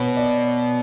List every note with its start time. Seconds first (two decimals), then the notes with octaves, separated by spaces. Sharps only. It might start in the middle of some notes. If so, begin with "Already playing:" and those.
Already playing: B2 B4 C#5
0.17 D5